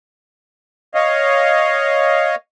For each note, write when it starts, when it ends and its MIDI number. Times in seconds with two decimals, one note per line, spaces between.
0.95 2.35 73
0.95 2.35 75
0.95 2.35 77